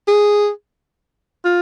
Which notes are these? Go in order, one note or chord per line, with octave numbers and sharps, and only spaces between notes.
G#4
F4